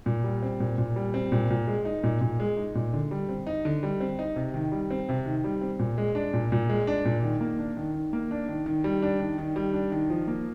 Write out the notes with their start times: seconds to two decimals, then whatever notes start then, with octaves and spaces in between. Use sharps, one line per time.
0.06 A#2
0.24 G3
0.42 C4
0.60 A#2
0.78 A#2
0.96 G3
1.14 C4
1.32 A#2
1.50 A#2
1.67 G#3
1.85 D#4
2.04 A#2
2.21 A#2
2.40 G#3
2.57 D#4
2.75 A#2
2.93 D3
3.11 G3
3.29 C4
3.47 D#4
3.65 D3
3.83 G3
4.00 C4
4.19 D#4
4.36 C3
4.54 D#3
4.72 G3
4.91 C4
5.09 C3
5.26 D#3
5.44 G3
5.61 C4
5.79 A#2
5.98 G#3
6.15 D4
6.34 A#2
6.52 A#2
6.70 G#3
6.87 D4
7.05 A#2
7.23 D#3
7.41 A#3
7.59 D4
7.77 D#3
7.94 D#3
8.13 A#3
8.31 D4
8.49 D#3
8.66 D#3
8.84 G3
9.02 D4
9.20 D#3
9.38 D#3
9.56 G3
9.74 D4
9.92 D#3
10.10 F3
10.27 A#3